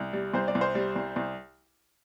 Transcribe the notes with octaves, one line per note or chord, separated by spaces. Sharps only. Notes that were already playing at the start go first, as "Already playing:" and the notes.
Already playing: C2
G3
C2 C5
D5
C2
C5
G3
C2
C2